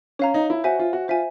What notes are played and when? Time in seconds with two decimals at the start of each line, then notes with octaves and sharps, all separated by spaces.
0.19 C#4 C#5 F5 A#5
0.34 D#4
0.50 E4
0.64 F#4 C5 E5 G#5
0.79 F4
0.93 F#4
1.08 F4 C5 E5 G#5